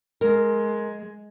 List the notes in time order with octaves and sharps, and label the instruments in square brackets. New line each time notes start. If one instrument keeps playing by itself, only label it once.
[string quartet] G#3 [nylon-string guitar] A#4